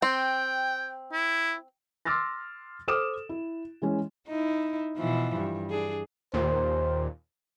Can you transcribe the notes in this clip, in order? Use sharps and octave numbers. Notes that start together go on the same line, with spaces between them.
C4 G5
E4
C6 D6 E6 F6 A6 A#6
A4 C5 D6 D#6 F6 E7
E4
E3 G#3 C#4
D#4 E4
B2 E3 F3
G2
D4 G#4
D#2 A#2 C5